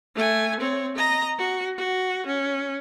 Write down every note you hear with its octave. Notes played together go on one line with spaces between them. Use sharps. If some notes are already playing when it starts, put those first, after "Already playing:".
A3 G#5
C4 C#5
D#5 A#5
F#4
F#4
C#4